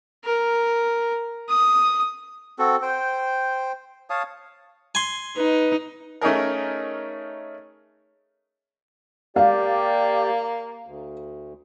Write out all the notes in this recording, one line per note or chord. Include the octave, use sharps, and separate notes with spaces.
A#4
D#6
C4 F#4 A4
C5 G5
C#5 F5 A5 D#6
G#5 C6
D#4 B4
A3 C#4 D#4 G#4 A#4
A#3 G4 D5 F5
D2